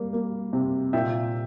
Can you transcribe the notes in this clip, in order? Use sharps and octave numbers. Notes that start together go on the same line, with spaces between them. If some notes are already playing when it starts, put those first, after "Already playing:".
Already playing: G3 A#3
A#3
C3
A#2 E5 G5